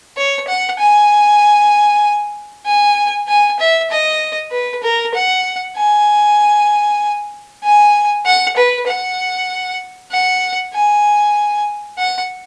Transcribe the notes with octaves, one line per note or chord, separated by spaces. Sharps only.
C#5
F#5
G#5
G#5
G#5
E5
D#5
B4
A#4
F#5
G#5
G#5
F#5
B4
F#5
F#5
G#5
F#5